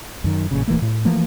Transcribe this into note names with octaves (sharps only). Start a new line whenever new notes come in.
F#2 D#3
A1 A#2 C#3
D1 E3 A3 A#3
A2
E3 F3 A3 A#3